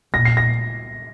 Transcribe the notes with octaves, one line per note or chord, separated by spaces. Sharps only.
A#2 A#6
C7
A#6